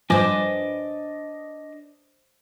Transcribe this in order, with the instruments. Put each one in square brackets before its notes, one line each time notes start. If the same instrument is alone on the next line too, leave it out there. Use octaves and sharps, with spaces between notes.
[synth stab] G2 F3 [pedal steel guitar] D4 D#5 D6 [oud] B4 C5 [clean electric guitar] G#5